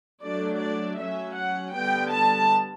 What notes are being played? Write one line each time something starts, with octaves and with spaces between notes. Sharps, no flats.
F#3 A3 D4 D5
D5
F#3 C#4 E5
F#5
D3 G3 B3 G5
A5